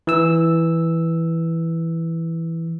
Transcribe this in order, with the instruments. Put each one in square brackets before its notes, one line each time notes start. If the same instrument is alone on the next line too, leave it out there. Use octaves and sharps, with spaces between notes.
[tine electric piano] E3 E6